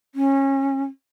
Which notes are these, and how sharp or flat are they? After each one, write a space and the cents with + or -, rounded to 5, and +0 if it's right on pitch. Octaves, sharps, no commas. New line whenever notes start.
C#4 -25